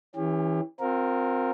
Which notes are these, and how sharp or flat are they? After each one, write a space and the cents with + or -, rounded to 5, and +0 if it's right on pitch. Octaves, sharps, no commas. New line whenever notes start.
E3 -15 C#4 +0 G4 +35
C4 +0 F4 +35 A#4 -5